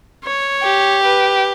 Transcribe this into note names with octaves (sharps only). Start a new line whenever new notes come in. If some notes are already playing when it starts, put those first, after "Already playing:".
C#5
G4
B4